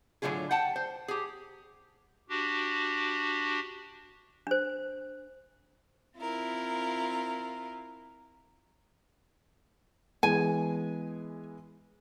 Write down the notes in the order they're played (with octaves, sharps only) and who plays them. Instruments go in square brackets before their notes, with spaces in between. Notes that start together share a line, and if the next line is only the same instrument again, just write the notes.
[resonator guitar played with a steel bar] A2 D3 D#3 F#3 F4 G#4
F#5 G5 A5
C5
G4 G#4
[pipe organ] D4 F#4 G4
[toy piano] D4 C5
[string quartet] C4 E4 F4 A#4
[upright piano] E3 G#3 B3 [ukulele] G#5